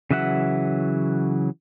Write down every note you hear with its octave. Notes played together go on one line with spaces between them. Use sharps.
C#3 E3 F#3 E5 F#5